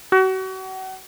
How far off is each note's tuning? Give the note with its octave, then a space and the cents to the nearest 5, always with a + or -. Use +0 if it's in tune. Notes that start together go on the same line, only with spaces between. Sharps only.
F#4 +35